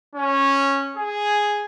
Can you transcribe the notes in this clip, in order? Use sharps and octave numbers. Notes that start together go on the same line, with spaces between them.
C#4
G#4